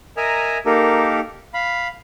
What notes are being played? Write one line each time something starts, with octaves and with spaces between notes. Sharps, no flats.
A#4 D#5 E5 G#5 A#5
A#3 D#4 G4 A4 A#4
F5 B5